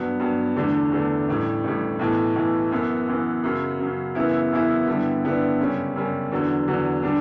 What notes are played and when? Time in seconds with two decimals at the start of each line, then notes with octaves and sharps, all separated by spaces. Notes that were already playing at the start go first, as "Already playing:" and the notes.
Already playing: G2 F#3 B3
0.20 G2 F#3 B3
0.56 E2 D3 A3 D4
0.92 E2 D3 A3 D4
1.28 A1 A2 G3
1.64 A1 A2 G3
1.99 B1 A2 E3
2.35 B1 A2 E3
2.71 F#2 E3 B3
3.07 F#2 E3 B3
3.44 F#2 C#3 F#3
3.80 F#2 C#3 F#3
4.15 F#2 C#3 E3 B3 E4
4.52 F#2 C#3 E3 B3 E4
4.88 G2 D3 G3 B3 E4
5.23 G2 D3 G3 B3 E4
5.60 F#2 C#3 G3 C#4
5.96 F#2 C#3 G3 C#4
6.31 E2 D3 F#3
6.68 E2 D3 F#3
7.03 D3 G3 D4